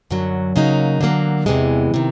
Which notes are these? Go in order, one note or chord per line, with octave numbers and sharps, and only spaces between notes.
F#2 D3 F#3
C#3 F#3 A#3 D#4
D3 F#3 A#3
E2 C3 E3 G#3
C3 D#3